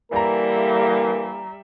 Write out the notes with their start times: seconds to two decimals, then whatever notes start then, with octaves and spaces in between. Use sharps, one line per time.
0.12 D3 E3 G3 A#3 A#4 D5 E5 A#5